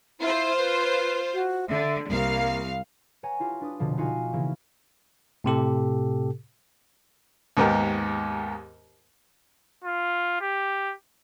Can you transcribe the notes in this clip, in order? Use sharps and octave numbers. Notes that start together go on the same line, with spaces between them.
E4 F4 C5
B4
F#4
D3 E5
C2 A#3 F5
B4 C#5 F#5 G#5 A#5
E4 F4 G4
D4 B4 D#6
F1 B2 D3 F3
D#4 F4 F#4 F5 G#5
C#3 E3 A#3 E4
A2 C3 G4 A4
D#2 G#2 B3 G4 A#4
F4
G4